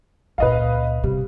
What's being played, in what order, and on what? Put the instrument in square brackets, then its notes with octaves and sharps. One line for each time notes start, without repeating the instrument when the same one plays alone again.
[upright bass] C#2 A#2 [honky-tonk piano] B4 D#5 F5
[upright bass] C3 [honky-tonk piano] G3